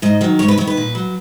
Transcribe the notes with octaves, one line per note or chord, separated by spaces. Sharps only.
G#2 D#5
D#3 F#3
G#2 C#5
B4
F#3 C#5
D#3
B4
A#2
F#3